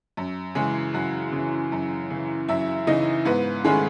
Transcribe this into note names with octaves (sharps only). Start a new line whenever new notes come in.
F#2
C#3 E3 G#3 G#4
F#2 F#4
C#3
E3
F#2
C#3 E3
F#2 E4 E5
C#3 E3 D#4 D#5
G#2 B3 B4
D#3 G#3 A3 C#4 G#4